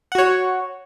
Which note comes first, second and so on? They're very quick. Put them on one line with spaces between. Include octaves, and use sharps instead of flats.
F#5 F#4 C#5